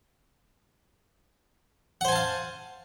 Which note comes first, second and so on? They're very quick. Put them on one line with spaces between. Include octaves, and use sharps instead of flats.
F#5 C5 G#5 A5 F5